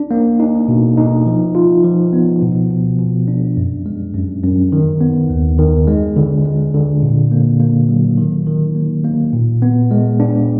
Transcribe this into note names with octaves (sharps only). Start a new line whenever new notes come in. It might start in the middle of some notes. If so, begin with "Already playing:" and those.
Already playing: D4
A#3
D#4
B2
D#4
F3
F4
F3
B3
B2
B2
B2
D4
F#2
G#3
F#2
F#2
D#3
B3
D#2
D#3
G#3
D3
G#3
D3
A#2
A#3
A#3
F#3
D#3
D#3
A#3
A#3
A#2
B3
G#3
D4